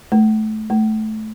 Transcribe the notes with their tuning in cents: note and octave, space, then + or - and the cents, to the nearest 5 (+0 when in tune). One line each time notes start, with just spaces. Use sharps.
A3 -20
A3 -15